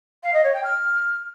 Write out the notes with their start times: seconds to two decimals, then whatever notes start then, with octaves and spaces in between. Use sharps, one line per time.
0.23 F5
0.34 D#5
0.44 C#5
0.54 G5
0.64 F6